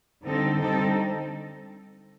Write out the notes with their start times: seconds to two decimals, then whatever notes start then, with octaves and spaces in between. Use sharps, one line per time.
0.24 D3 G3 C4 D#4 A4
0.58 D3 G3 C4 D#4 A4